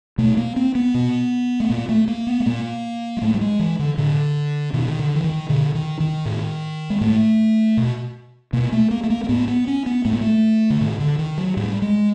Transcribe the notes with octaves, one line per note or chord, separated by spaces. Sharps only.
B2 A3
A#3
C4
B3
B2
A3
A#2 A#3
A3
A#3
B3
A3
A#2 A#3
G#3
A2 A3
G3
G#3
E3
D3
A2 D3
B2 D#3
D#3
D3
E3
D#3
B2 D3
D#3
D#3
A2
G#3
A2 A3
B2
B2 A#3
A3
A#3
A3
A#3
A#3
A2 B3
B3
C#4
B3
A2 A3
A#3
A3
D3
A2 D#3
D3
D#3
F#3
A2 G3
G#3